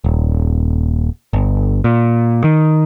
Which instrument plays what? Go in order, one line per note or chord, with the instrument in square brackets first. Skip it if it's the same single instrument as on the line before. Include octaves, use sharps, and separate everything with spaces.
[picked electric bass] D#1
G1
A#2
D#3